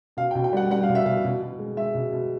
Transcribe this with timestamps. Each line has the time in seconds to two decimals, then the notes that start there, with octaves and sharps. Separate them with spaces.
0.17 B2 F5
0.31 G5
0.35 B2
0.44 G5
0.53 G3 F#5
0.71 G3 F#5
0.83 F5
0.89 B2
0.95 E5
1.05 B2 F5
1.24 B2
1.41 B2
1.59 G#3
1.77 G#3 E5
1.95 B2
2.12 B2